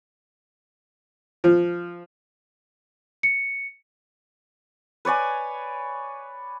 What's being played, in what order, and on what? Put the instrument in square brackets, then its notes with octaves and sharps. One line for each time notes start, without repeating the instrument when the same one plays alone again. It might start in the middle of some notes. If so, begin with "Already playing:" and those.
[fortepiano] F3
[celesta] C#7
[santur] B4 C#5 D5 G#5